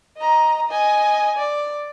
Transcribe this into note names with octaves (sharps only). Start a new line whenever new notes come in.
D#5 A#5
D#5 G#5
D5